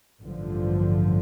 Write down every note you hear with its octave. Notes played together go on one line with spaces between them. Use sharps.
A1 G2 D3 F3